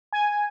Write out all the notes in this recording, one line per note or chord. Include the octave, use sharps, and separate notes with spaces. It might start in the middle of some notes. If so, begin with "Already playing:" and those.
G#5